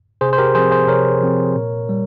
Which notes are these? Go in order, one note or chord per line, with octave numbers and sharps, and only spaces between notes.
C3 G#4 C5
C5
G4 A#4
F3 C4 G#4 C5
G#4 C5
C3 A#4 C#5
F3 C4
A#2
G3